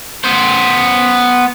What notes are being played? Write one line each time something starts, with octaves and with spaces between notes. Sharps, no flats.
B3 C5